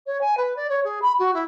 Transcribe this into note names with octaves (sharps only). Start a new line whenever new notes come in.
C#5
G#5
B4
D5
C#5
G#4
B5
F#4
E4